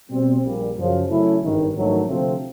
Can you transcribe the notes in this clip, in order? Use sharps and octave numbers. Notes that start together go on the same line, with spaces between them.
B2 G3 C4
A#1 A#2 G3
F#2 C#3 F3
C#3 F#3 A3 C#4 E4
G#1 G2 D#3
A#1 G#2 D#3 F#3 A3
D2 C3 F3 A3 C4